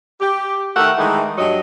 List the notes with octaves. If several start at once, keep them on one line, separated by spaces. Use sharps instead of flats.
G4
D#3 A3 A#4 E5 F#5
D#3 E3 G#3 A3
G2 F#3 D#5